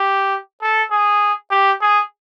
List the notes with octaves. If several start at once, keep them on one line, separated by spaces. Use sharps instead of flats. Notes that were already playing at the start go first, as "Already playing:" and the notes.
Already playing: G4
A4
G#4
G4
G#4